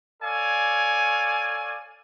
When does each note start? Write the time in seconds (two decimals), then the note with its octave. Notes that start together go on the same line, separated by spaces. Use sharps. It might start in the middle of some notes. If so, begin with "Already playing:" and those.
0.23 A4 C#5 D5 F5 G#5